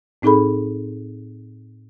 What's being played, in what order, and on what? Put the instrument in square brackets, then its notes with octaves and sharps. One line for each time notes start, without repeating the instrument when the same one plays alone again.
[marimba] A2 C4 D#4 G#4 A4 B5